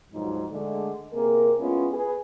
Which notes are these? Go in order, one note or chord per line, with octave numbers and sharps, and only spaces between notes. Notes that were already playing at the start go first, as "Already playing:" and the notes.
D2 G#2 B2 F3 F#3 D#4
D3 G#3 A3
C3 A#3 G#4 A#4
G#3 B3 C#4 E4 F4
G#4 B4